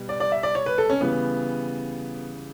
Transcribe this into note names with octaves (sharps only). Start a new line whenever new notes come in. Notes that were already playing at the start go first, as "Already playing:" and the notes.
Already playing: B2 G3
D5
D5
E5
D5
C#5
B4
A4
C#4
C#3 E3 G3 B3